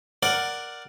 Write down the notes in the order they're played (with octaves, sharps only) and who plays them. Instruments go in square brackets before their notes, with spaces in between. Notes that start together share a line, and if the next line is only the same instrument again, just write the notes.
[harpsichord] A#4 D5 F#5